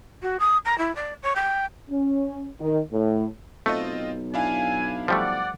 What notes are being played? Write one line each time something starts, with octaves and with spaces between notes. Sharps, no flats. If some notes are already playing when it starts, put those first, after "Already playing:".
F#4
D#6
A#5
E4
D5
C#5
G5
C#4
D#3
A2
B1 A3 C4 F4 D#5
D4 E4 F5 G#5
F3 G3 A3 D5 F#5